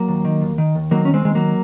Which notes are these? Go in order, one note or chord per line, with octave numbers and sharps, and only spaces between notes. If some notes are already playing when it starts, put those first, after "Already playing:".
Already playing: F#3 A#3
D#2
D#3
D#2
D#3
D#2
D#3 F#3 A#3
D#2 C#4
G#3 C4
D#3 G#3
F#3 A#3